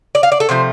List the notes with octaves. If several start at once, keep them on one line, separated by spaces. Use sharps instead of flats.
D5
F5
D5
A4
C3 F3 A3 C5